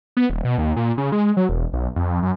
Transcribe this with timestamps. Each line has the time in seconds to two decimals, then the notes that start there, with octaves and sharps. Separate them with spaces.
0.17 B3
0.30 D#1
0.45 B2
0.58 D#2
0.77 A#2
0.98 C#3
1.12 G#3
1.37 F#3
1.49 E1
1.73 B1
1.96 F2
2.23 F#2